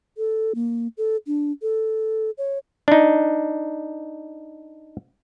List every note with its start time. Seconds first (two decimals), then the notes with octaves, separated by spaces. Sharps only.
0.17 A4
0.55 A#3
0.98 A4
1.27 D4
1.62 A4
2.38 C#5
2.88 D4 D#4